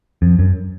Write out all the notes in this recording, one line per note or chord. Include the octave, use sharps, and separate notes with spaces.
F2
F#2